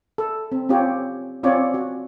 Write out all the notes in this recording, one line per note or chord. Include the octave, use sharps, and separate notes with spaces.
A4
C4
C4 C#4 F4 G4 C#5
C4 C#4 F4 C#5 D5
F#4